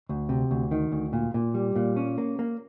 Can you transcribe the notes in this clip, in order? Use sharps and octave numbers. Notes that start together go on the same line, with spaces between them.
D2
C3
D2
D#3
D2
A#2
A#2
G3
A#2
C#4
A#3
A#3